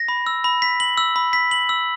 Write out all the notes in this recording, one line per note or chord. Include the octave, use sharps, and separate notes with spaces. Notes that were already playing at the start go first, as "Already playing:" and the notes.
Already playing: A#6
B5
E6
B5
B6
F#7
E6
B5
B6
F#7
E6